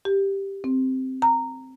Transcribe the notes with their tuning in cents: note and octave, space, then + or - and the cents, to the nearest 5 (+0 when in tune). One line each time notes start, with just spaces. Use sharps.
G4 +0
C4 -5
A#5 -10